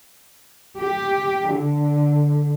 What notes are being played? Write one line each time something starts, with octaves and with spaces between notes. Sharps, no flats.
G4
D3